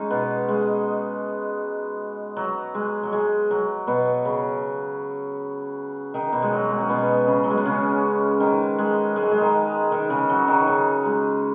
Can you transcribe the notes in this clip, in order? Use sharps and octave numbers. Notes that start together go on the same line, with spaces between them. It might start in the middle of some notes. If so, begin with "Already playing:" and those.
Already playing: G#3 C#4 D#4
B2 B3
G#3
F#3
G#3
F#3
G#3
F#3
B2 B3
C#3 C#4
D#3 D#4
B2 B3
G#3
F#3
G#3
C#4
B2 B3
C#3 C#4
F#3
G#3
B3
C#3 C#4
D#3 D#4
G#3
G#3
F#3
G#3
D#3 D#4
D#3 D#4
C#3 C#4
F#3 F#4
D#3 D#4
C#3 C#4
G#3